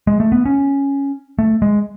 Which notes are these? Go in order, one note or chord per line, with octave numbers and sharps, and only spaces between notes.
G#3
A3
B3
C#4
A3
G#3